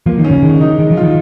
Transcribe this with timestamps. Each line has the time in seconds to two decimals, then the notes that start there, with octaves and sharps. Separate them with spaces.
0.06 F3 A#3
0.18 D#3
0.25 C#4
0.31 C#3
0.42 D#3 G#3
0.61 D#4
0.79 D#3 G#3
0.91 F3
0.97 F4
1.03 D#3